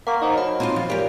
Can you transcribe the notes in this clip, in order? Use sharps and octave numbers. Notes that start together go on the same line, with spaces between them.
A#3 F#5 C#6
D#4 C5 D#5 F5
F#3 A5 B5
C4 D#4 F4
F3
A#2 G4 A#4